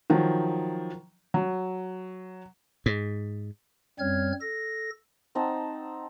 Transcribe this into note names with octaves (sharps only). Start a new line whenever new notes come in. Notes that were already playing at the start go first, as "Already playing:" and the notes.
D#3 F3 F#3
F#3
G#2
F#2 G3 C4 C#5 F6 G#6
A4 A#6
C4 D#4 F#5 A5